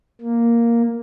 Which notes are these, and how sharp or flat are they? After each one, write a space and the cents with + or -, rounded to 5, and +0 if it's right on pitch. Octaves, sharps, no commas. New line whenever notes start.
A#3 +0